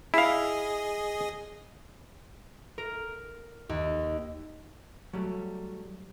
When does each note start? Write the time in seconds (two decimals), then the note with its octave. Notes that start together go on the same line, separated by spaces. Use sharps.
0.14 E4 G#4 D#5 F5
2.78 A#4
3.69 D#2
5.13 F#3 G3 A3